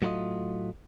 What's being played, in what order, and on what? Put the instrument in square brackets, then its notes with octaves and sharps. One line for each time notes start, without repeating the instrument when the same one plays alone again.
[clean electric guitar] A2 F#3 A3 D#4 F4 D#5